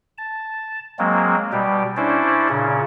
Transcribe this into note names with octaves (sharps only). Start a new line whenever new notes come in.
A5
F#3 G#3 A#3 C4
B2 G3 G4
C#4 D4 E4 C5 D5
A#2 C#3 C#4